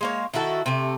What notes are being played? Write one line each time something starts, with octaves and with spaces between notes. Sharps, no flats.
G#3 A#3 C#5
D#3 E4 F#4 A4
C3 A3